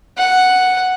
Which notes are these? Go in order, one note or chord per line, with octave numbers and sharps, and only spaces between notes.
F#5